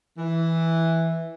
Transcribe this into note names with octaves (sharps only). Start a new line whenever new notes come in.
E3